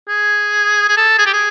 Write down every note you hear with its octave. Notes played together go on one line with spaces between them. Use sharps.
G#4
G#4
A4
G#4
G4
G#4